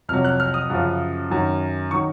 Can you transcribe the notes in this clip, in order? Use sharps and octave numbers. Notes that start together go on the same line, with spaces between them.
F2 C3 F#3 F6
F#6
F6
D#6
F#2 C#3 F3
F#2 D#3 F#3
D#3 F#3 C#6